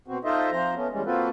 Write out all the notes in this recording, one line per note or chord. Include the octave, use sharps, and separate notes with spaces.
B2 C4 F#4
D#4 F4 A4 C5 D#5 E5
F3 C4 C5 A#5
A3 B3 C#4
E2 G3 G#3 C#4
A#3 C4 F4 F#4 A4 B4